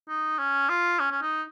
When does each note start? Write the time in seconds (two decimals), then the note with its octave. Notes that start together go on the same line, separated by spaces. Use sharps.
0.09 D#4
0.39 C#4
0.69 F4
0.99 C#4
1.11 C#4
1.22 D#4